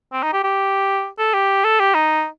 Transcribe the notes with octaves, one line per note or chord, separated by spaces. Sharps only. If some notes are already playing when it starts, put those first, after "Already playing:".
C4
D#4
G4
G4
A4
G4
A4
G4
D#4